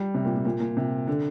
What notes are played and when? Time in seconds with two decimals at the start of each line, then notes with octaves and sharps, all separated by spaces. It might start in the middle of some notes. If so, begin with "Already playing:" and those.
Already playing: G3
0.14 C3
0.25 A#2
0.35 A#2
0.45 A#2
0.60 A#2
0.77 C3
1.07 D3